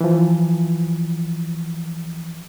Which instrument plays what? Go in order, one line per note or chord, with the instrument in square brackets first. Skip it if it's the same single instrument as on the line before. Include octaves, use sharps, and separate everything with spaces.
[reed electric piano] E3 F3